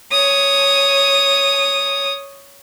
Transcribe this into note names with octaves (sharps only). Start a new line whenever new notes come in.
C#5 D#6